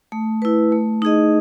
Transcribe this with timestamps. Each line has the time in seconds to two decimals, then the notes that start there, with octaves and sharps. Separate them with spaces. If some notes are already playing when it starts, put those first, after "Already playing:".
0.12 A3
0.42 E4 B4
0.72 A3
1.02 D#4 G#4 D#5